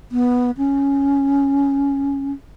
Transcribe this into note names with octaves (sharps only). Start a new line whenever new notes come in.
B3
C#4